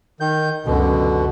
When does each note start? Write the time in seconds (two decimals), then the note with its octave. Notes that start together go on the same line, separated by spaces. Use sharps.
0.20 D#3 G6
0.66 C#2 F#2 B2 D3